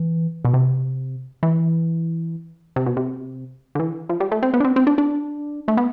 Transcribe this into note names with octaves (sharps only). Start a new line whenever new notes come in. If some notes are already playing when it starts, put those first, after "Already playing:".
Already playing: E3
B2
C3
E3
C3
B2
C3
D3
E3
F3
G3
A3
C4
B3
D4
C4
C4
D4
D4
A3
B3